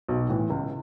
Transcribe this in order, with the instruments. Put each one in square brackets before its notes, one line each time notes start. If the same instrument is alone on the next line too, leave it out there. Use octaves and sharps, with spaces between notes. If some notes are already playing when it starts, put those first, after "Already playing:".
[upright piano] B1
A2 E3
C#2